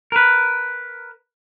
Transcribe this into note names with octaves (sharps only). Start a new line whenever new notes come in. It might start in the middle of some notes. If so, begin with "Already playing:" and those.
A#4 B4